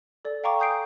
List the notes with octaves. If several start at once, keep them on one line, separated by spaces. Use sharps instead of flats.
A4 D5
F5 G5 A#5 C#6 D6
G#5 D#6 G6 C7 D7